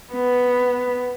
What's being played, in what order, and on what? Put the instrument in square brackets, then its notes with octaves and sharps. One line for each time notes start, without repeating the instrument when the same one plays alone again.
[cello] B3